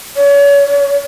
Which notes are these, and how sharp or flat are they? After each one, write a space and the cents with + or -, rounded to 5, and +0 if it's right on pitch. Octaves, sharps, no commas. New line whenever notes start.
C#5 +40